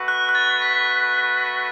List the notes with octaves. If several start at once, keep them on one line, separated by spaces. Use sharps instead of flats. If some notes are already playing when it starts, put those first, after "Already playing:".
Already playing: A3 F#4 B4
F#6
F#6
A6
B6